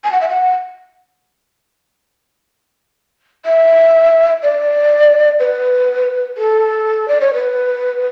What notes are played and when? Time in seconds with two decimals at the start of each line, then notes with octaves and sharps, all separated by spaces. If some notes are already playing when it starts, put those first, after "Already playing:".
0.04 G#5
0.12 F#5
0.21 E5
0.29 F#5
3.45 E5
4.43 D5
5.40 B4
6.38 A4
7.08 D5
7.21 C#5
7.34 B4